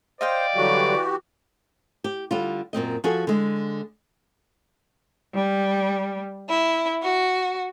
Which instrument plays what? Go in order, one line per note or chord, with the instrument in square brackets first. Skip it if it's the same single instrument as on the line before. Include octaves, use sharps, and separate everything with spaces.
[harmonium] C5 [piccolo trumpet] D5 [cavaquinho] D#5 F5 G5
[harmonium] D3 F#3 G3 [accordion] E3 F#4 G4
[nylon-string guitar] G4
D3 G3 F4
F#2 A#2 C4 D#5
F3 F#4 G#4 A4 G#5
D3 G#3
[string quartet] G3
E4
F#4